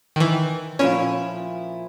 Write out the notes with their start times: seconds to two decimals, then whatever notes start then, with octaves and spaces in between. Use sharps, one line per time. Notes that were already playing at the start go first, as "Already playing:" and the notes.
0.16 D#3 E3
0.79 A#2 F3 C#4 E4